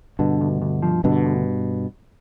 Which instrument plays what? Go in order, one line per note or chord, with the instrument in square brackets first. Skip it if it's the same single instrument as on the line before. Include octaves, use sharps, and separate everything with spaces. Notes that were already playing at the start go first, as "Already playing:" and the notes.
[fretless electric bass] G2 B2 [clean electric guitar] D3
[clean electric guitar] D2
D2
F3
[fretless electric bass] G2 B2 [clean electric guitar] D3
[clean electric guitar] D2